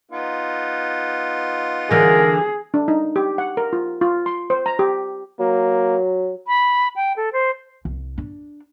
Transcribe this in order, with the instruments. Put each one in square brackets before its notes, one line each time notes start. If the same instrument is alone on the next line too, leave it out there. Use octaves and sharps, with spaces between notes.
[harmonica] B3 D#4 F4
[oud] D3 E3 [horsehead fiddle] G#4 [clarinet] A#4
[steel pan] D4
D#4
G4
F#5
A#4
F4
F4
C6
C5
A#5
G4
[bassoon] F#3 [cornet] A#3
[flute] B5
G5
A4
C5
[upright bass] C2
D4